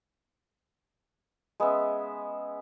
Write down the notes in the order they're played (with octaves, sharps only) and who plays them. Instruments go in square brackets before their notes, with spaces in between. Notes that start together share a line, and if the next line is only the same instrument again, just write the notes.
[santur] G#3 B3 C#4 E5